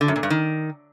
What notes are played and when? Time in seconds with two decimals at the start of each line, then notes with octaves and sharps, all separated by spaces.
0.01 D3
0.08 F#2
0.16 A#2
0.23 G2
0.30 D#3